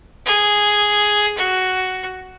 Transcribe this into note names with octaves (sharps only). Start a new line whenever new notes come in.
G#4
F#4